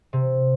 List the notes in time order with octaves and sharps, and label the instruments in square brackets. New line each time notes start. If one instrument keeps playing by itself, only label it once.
[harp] C3